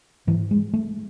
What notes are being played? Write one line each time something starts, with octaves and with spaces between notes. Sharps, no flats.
G#2 E3
G#3
A3